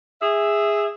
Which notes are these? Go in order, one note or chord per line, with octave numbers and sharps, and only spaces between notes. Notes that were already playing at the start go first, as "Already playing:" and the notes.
G#4 E5